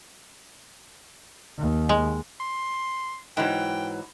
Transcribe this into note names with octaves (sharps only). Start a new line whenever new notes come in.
D#2
G#3
C6
G#2 E3 F#3 G5